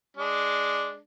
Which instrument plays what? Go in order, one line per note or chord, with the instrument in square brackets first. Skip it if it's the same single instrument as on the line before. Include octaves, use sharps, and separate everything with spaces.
[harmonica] G#3 D4